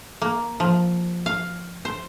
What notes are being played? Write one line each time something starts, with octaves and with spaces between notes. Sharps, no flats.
A#3
F3
F5
C5